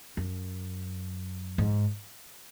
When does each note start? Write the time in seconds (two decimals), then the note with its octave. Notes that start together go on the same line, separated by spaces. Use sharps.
0.17 F#2
1.58 G#2